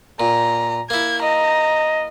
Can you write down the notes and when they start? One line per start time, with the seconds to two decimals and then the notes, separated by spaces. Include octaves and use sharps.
0.20 A#2 A#5
0.90 A#3 E4 G#6
1.23 D#5 A#5